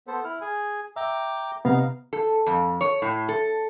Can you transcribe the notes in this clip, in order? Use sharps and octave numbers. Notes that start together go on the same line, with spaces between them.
B3 A4 C5
E4 F6
G#4 G#5
E5 G5 A#5 D6
C3 B3 D#4 F5 A#5
A4
F2
C#5
A2
A4